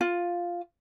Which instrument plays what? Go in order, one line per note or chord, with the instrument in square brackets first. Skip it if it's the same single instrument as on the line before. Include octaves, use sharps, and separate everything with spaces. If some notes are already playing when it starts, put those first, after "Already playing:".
[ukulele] F4